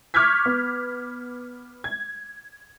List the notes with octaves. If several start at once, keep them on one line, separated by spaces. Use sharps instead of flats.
C#6 D6 F6 G6 G#6 B6
B3
G#6